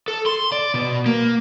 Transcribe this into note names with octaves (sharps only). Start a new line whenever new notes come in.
A4
C6
D5
B2
A#3